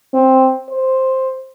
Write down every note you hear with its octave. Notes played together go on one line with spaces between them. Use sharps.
C4
C5